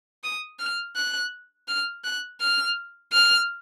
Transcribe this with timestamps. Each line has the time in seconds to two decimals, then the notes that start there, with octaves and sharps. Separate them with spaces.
0.24 D#6
0.59 F6
0.96 F#6
1.68 F6
2.04 F#6
2.40 F6
3.13 F6